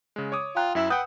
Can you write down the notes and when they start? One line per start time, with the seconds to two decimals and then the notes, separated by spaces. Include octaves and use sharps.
0.16 C#3 G#3
0.32 C#5 D6 D#6
0.56 F4 G5 A#5 F#6
0.75 F#2 E4 E5 E6
0.90 B4 F#5 G5 D#6 G6